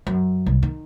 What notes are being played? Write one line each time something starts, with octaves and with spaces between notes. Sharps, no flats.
F#2
C2
D#3